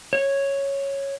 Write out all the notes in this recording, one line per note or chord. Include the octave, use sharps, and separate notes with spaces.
C#5